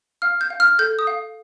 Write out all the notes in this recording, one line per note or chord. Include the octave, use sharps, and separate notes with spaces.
F5 F6
G6
F5
F6
A4 G6
D#6
F5